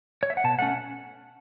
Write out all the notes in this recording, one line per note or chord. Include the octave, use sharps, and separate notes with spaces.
C#5
E5
F#5
B2 A5
A3 C#4 F#5